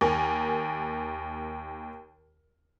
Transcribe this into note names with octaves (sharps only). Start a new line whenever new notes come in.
D#2 A#4 G#5